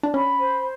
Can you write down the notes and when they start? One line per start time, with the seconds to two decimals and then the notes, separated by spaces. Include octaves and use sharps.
0.03 D4
0.14 C#4 B5
0.38 C5